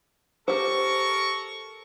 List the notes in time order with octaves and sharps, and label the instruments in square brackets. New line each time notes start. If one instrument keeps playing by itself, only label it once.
[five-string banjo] G4 C5 [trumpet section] A4 A#4 C#6